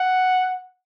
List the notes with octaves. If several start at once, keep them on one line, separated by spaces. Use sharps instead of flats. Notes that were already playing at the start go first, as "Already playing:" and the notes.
Already playing: F#5